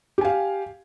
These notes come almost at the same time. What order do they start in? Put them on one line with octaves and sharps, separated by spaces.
G4 G#5 F5